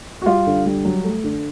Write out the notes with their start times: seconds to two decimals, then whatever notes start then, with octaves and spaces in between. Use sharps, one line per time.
0.22 F#4
0.26 G3 F4 G4
0.47 D3
0.66 G3
0.85 F#3
1.04 A3
1.24 D3